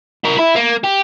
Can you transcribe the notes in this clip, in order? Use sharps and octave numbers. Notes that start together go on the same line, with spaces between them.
E4 A#4
E4
A#3
G4